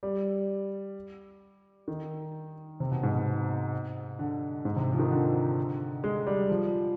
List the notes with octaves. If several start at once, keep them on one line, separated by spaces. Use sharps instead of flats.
G3
D#3
C3
B2
G#2
B2
D3
G#2
C3
F3
D#3
D3
G#3
G3
F3